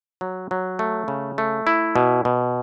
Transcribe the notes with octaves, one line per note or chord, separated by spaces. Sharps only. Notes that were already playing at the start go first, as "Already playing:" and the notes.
F#3
F#3
A3
C#3
A3
E4
B2
B2